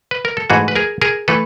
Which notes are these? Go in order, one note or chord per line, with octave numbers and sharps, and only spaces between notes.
B4
A#4
A4
G#2 E3 A3 F#4 G#4
B4
G#4 A#4
G#4 A#4
E3 A3 A4 B4